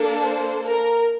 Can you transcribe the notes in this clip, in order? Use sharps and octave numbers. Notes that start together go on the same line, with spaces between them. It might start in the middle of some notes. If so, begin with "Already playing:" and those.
Already playing: A#3 D4 A4
C5
A#4